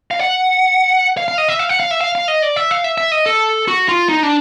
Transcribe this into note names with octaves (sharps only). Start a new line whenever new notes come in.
F5
F#5
F5
F5
D#5
E5
F5
F#5
F5
E5
F5
F5
D#5
D5
E5
F5
E5
E5
D#5
A4
F#4
F4
D#4
D4